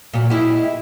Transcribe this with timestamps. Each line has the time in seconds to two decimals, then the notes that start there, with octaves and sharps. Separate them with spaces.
0.14 A#2 F#3
0.30 G#3 E4 G4